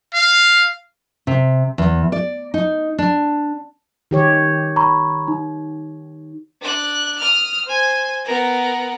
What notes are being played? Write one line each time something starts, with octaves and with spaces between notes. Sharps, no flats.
F5
C3
E2
D5
D#4
D4
D#3 G4 C#5
A#5 B5 C#6
D#4
D4 F#6
D#6 F6
C5 G#5
B3 A#4